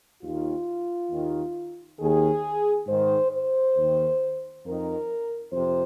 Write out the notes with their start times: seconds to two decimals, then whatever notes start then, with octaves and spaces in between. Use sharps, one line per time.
0.22 D#2 D#3 F4
1.11 D#2 D#3
1.99 D#2 D#3 G#4
2.87 G#2 D#3 C5
3.31 C5
3.77 D#2 D#3
4.65 F2 D#3 A#4
5.52 F2 C3 C5